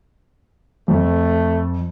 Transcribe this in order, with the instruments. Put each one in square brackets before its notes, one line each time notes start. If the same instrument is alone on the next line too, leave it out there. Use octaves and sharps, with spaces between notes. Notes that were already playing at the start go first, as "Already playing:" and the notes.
[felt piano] F2 [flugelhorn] A3